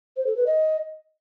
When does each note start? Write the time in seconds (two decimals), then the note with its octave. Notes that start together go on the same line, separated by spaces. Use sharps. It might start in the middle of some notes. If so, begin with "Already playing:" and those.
0.17 C5
0.27 A4
0.36 B4
0.46 D#5